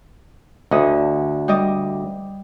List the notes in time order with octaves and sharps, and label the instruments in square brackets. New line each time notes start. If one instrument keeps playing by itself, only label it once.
[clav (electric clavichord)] D2 [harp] D3 D#5
[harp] G3 D#5 D6